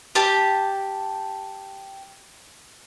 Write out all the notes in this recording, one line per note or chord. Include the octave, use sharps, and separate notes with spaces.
G4 A5